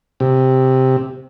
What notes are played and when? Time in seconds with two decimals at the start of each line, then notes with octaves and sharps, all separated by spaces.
0.20 C3